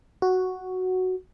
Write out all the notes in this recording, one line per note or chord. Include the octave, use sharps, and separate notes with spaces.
F#4